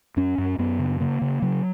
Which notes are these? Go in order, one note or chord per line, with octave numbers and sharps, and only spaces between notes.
F#2 C#4
F#2
F#2 B3
C#3
C#3 A#3
C#3
C#3 F#3